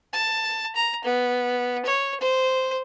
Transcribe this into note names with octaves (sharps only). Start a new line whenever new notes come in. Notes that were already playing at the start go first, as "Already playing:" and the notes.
A5
A#5
B3
C#5
C5